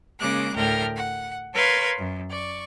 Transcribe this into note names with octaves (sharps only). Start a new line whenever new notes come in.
C#3 G#3 A#3 D6 F#6
D2 A2 A#4 G5 F6
F#5
A#4 B4 C#5 F5 C6 G#6
F#2
D5 C#6